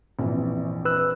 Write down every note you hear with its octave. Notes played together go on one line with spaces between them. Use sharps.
A#1 F2 E3
B4 E6 F#6